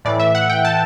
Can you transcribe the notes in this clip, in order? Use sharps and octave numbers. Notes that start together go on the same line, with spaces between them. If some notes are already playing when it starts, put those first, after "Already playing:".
A2 E3 D5
E5
F#5
G5
A5